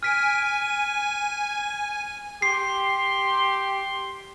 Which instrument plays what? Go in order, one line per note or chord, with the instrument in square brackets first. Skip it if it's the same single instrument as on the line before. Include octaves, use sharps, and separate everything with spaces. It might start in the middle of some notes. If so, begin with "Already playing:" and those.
[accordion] G#5 [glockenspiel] F6 B6 D7
[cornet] G4 [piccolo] C6 [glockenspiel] C7